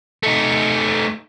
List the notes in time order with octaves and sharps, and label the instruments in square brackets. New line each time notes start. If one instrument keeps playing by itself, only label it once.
[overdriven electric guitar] A3 D#4